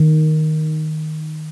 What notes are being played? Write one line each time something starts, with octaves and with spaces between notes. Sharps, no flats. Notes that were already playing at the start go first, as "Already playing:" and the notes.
Already playing: D#3